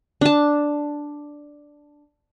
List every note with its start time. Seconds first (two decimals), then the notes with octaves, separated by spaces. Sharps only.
0.21 D4 A5